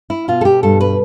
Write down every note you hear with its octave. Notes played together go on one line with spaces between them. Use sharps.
E4
B2 F4
A4
G4
G2 A4
B4